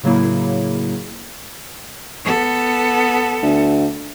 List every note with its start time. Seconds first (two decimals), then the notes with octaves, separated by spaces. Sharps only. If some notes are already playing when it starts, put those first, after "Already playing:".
0.03 A2 C#3 F#3 A#3 E4
2.24 B3 A4
3.42 D2